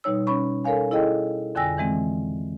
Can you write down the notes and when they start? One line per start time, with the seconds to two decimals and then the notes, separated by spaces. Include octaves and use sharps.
0.04 B2 G3 D#4 C#5 E6
0.27 C#4 C#5 B5 C#6
0.64 A4 A#4 C#5 F5 G#5
0.91 E4 G#4 A4 D#5 G5
1.55 F2 D3 G5 G#5 E6 A#6
1.77 D#3 E3 G#3 C4